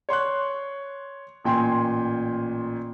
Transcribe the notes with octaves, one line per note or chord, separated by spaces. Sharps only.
C#5 C6 C#6 F#6
A1 A#2 G5 G#5 C6